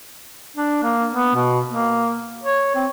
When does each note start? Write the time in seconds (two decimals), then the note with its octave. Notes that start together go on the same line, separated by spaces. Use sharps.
0.56 D4
0.83 A#3
1.12 B3
1.35 B2
1.69 A#3
2.43 C#5
2.75 C4